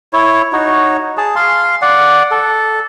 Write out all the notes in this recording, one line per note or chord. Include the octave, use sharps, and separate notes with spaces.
E4 C#5
D#4 F#4 C#5
G#4 A5
F5 C6
D5 F#5
A4